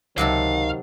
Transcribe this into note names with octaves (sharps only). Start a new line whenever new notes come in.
C#2 C3 D#3 F#3 A4 F5